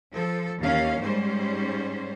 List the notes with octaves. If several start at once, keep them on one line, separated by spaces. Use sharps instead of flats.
F3 A4
D#2 E3 A#3 C#4 F5
G#2 G3 C#4 C5